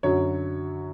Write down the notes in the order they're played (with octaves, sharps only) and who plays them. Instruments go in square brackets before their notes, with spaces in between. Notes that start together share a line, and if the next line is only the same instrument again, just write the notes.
[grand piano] F#2 D3 F#3 C#5